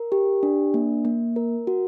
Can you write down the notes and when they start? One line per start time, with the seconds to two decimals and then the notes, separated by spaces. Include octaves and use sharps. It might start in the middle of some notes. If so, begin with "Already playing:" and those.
Already playing: A#4
0.12 G4
0.43 D4
0.74 A#3
1.05 A#3
1.36 A#4
1.67 F#4